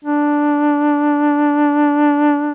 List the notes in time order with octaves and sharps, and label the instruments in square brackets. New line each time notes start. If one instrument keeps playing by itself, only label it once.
[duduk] D4